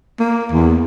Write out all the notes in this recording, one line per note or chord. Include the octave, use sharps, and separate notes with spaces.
A#3
E2